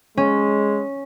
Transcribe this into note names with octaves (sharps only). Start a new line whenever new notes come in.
G#3 C#4